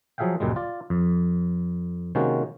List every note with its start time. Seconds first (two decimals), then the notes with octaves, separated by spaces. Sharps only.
0.18 F3 F#3 G#4 E5 F5 G5
0.40 C#2 F#2 A#2 G3 G#3
0.56 F4 D5
0.90 F2
2.15 C3 D#3 G#3 A#3 C#4 F#4